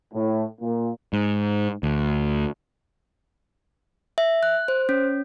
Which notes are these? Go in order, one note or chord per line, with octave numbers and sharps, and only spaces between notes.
A2
A#2
G#2
D2
E5
F#6
C5
C#4